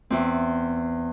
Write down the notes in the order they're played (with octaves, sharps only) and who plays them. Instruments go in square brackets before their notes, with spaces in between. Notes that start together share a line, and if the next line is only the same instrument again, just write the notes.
[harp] E2 C4